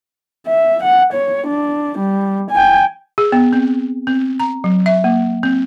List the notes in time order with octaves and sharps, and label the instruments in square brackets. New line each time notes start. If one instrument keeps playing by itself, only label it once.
[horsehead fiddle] E5
F#5
C#5
D4
G3
G5 G#5
[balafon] G#4
B3
C4
C4
A#5
F#3
E5
A#3
C4